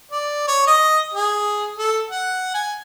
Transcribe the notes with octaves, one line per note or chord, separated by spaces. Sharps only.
D5
C#5
D#5
G#4
A4
F#5
G#5